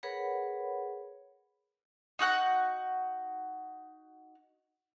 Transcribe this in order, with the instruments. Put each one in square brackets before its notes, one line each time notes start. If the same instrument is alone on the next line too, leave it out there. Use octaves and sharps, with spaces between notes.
[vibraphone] G#4 A#4 B4 C#5 F#5 B5
[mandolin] D#4 F#4 F#5 F#6